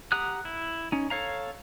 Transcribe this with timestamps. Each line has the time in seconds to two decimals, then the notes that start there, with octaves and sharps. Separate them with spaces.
0.12 G4 F#5 A#5 D#6 F#6
0.45 E4
0.92 C#4 D#4
1.10 A4 C#5 F5 A#5